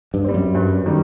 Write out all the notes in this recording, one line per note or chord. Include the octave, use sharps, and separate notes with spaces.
G2
G3 C4
F#2
G2
D#3 G3